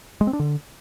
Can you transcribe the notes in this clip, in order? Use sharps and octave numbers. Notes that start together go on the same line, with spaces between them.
G#3
C4
D4
D3